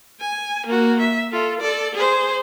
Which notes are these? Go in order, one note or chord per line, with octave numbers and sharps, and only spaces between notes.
G#5
A#3 F#4
E5
F4 A4
A4 D5
G#4 C5